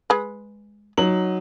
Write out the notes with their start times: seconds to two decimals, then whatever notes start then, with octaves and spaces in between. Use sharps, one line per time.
0.10 G#3 B4
0.97 F#3 D#4 F#7